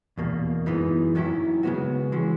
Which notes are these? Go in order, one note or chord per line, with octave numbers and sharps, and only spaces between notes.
E2 B2 A#3
F#2 E3 G#3 B3 D#4
D#3 F#3 C#4 E4
C#3 G#3 B3 F#4
E3 G#3 C#4 F#4